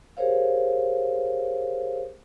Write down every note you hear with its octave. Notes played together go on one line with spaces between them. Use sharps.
G4 G#4 A#4 C5 C#5 F5